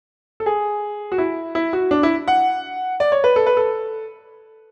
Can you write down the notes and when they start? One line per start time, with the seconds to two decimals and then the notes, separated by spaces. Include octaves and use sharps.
0.40 A4
0.46 G#4
1.12 F#4
1.18 E4
1.55 E4
1.73 F#4
1.91 D4
2.03 E4
2.28 F#5
3.00 D5
3.12 C#5
3.24 B4
3.36 A4
3.46 B4
3.57 A4